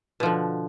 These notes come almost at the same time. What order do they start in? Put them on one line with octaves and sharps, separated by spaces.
B2 F3 D3